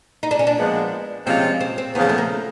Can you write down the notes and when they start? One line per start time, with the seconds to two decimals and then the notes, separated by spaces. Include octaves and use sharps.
0.23 D#4
0.31 D4
0.39 C#4
0.47 D4
0.57 A#2 F3 G#3 B3 D4
1.27 C3 F3 G#3 C4 C#4 F4
1.61 C4
1.78 C4
1.95 E2 C#3 F3 B3
2.09 A3
2.18 A#3